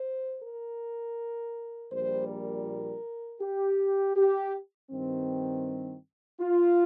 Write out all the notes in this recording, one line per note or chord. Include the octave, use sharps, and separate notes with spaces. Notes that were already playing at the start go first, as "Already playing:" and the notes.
Already playing: C5
A#4
A#1 A#2 G3 C5
A#4
G4
G4
G2 D#3 C4
F4